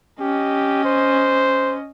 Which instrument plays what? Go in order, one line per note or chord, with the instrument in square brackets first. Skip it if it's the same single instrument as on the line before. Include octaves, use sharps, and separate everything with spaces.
[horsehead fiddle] C#4 D#5 [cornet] G4
[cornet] C5